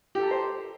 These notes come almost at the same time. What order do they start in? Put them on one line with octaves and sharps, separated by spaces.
G4 A4 A5 A#5 C5